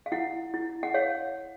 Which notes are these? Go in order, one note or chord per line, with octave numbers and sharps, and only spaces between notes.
F5
E4 F#5
E4
F#5
C#5 F5